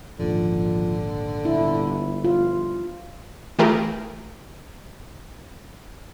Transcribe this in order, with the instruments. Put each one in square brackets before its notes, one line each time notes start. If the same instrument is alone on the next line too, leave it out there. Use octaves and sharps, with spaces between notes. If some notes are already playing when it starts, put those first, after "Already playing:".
[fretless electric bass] D#1 G#1 D#2 [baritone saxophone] D3 [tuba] F3
[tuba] G1 [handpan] E4
[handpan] F4
[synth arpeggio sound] E3 A3 F4 G4 G#4 A#4